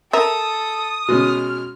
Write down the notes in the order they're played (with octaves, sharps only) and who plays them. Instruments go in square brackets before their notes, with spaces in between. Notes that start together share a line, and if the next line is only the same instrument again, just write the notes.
[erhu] A4 [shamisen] A#4 E5 [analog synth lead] D#6
[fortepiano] B2 G#3 C#4 [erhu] F6